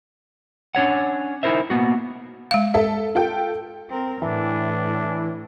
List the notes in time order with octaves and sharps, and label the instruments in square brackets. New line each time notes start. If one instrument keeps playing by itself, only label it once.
[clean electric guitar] C#4 D4 C#5 F#5
D#4 E4 A#4 C5 E5
A#3 B3 F#4
[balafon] G#3 F5
[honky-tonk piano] A4 E5
F4 A4 G5
[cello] C4 A#4
[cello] A2 [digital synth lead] E3 [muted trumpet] D4